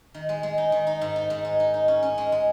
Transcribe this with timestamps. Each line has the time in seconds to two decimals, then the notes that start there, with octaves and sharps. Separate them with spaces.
0.14 D#3
0.29 G#3
0.43 G#3
0.58 D#4
0.72 D#3
0.87 D#4
1.01 G#2
1.16 D#4
1.30 G#2
1.45 G#3
1.60 D#4
1.74 D#4
1.88 C#4
2.03 C#4
2.18 G#3
2.32 G#3